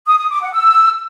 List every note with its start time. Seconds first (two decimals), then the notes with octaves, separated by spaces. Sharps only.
0.06 D#6
0.18 D#6
0.30 D6
0.41 F#5
0.53 E6